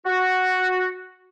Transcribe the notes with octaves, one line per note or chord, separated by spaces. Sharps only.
F#4